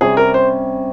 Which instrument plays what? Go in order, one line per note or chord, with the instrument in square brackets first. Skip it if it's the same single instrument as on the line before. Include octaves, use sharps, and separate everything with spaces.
[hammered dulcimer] C3 G3 C#4 [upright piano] G#4
[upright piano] A#4
C5